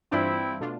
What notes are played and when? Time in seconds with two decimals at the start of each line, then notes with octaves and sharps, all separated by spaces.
0.11 G2 E3 G3 C4 D4 E4 F4
0.61 B2 A3 D4 F4